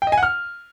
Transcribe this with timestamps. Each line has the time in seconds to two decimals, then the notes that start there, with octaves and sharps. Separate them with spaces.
0.02 G5
0.07 D#5
0.12 G#5
0.17 F#5
0.23 F6